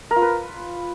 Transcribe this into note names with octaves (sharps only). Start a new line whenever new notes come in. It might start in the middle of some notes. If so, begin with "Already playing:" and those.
A#4
F4
B4